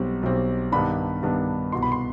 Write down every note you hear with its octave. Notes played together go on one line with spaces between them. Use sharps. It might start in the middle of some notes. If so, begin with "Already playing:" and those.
Already playing: B1 B2 G3 C4
B1 B2 G3 C4
G2 D#3 B3 D4 B5
G2 D#3 B3 D4
C2 B2 B3 C6
B5
C6